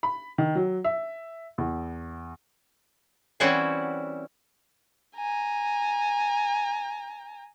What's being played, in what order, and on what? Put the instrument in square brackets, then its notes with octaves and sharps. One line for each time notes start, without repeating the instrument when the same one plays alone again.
[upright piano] B5
D#3
F#3
E5
E2
[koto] E3 G3 C4 C#4 E4 F#4
[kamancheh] G#5 A#5